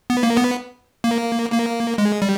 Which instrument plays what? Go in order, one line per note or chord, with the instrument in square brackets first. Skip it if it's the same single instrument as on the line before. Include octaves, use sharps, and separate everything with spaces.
[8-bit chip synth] B3
A#3
B3
A#3
A#3
G#3
G3